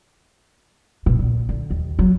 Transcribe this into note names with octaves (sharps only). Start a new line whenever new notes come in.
B2
A#2
D3
D#2
F#3